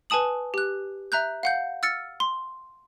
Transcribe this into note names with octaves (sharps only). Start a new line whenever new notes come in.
B4 G#5 A5 D#6 F#7
G4 F#6
E5 A#5 F#6 G6
F5 F#5 G6
E6 F6 A6 C#7
C6